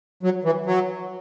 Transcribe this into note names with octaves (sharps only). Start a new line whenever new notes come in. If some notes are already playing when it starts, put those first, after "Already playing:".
F#3
E3
F#3